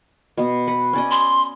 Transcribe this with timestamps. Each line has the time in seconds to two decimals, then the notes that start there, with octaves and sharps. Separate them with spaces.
0.37 B2 B3
0.67 B4 F#5
0.93 C#4 D5 D#5
1.11 C6